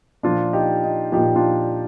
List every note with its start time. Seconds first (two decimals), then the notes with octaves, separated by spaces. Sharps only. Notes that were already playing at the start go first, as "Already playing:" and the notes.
0.23 A#2 F3 D4 F4
0.53 D#4 G4
0.84 D#4
1.12 A#2 F3 D#4 G4
1.35 D4 F4